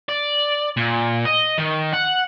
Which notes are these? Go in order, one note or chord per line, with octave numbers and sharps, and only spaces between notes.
D5
A#2
D#5
D#3
F#5